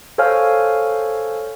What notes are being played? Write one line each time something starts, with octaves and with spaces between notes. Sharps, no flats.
A4 C5 C#5 F5 G#5 F6